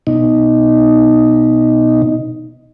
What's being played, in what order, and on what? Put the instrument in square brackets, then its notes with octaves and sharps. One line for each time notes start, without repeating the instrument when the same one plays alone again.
[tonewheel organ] B2 D#4